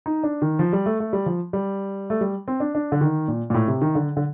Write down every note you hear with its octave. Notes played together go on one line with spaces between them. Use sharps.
D#4
D4
D#3
F3
G3
A3
A3
G3
F3
G3
A3
G3
C4
D4
D4
D3
D#3
A#2
A#2
A2
C3
D#3
D3
D3